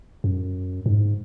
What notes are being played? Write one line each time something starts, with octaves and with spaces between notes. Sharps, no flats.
F#2
G#2